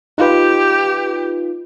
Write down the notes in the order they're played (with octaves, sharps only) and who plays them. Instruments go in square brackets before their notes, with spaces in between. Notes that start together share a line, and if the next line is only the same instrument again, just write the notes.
[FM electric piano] D#4 F4 B4 [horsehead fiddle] G4